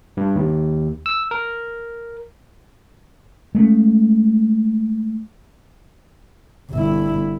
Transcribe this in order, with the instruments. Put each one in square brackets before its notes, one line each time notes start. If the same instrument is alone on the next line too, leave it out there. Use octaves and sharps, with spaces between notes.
[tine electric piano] G2
D#2
E6
A#4
[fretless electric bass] G#3 A3 C#4
[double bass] G1 E4